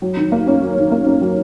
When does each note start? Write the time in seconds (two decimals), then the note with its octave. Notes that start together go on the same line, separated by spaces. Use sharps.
0.02 F#3
0.17 D#3
0.32 A#3
0.47 C#4
0.62 F#3
0.77 D#3
0.92 A#3
1.06 C#4
1.21 F#3